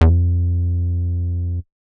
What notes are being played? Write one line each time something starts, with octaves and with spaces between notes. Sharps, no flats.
E2
F2